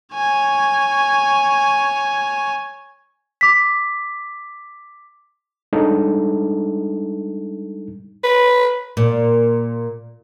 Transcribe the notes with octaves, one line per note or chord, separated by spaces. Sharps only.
C#5 G#5
D6 B6
G3 G#3 D4 D#4 A4
B4
A#2